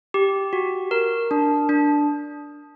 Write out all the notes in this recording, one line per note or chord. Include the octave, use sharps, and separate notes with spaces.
G4
F#4
A#4
D4
D4